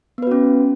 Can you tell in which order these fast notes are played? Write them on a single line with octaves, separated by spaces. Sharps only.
B3 B4 F#4 C#4